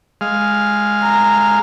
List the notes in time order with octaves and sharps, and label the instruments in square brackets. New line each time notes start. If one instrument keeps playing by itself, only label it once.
[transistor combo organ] G#3 F5
[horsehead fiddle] A#5